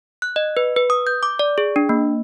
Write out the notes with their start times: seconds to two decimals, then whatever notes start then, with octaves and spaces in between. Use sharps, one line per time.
0.22 F#6
0.36 D#5
0.57 B4
0.76 B4
0.90 D#6
1.07 G6
1.23 D6
1.39 D5
1.58 G#4
1.76 D4
1.89 A#3